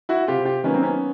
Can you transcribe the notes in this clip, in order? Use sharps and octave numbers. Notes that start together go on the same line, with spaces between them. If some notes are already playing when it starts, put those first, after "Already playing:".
E4 F#4
C3 F4 G4
F4 G4
D#3 F#3 A#3 B3 C#4
C4
B3 C#4